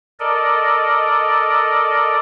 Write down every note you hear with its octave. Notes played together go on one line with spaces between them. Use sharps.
A4 A#4 D5 D#5